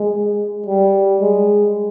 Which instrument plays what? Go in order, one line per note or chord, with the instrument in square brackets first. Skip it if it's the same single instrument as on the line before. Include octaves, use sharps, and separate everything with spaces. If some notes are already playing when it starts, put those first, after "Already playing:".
Already playing: [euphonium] G#3
G3
G#3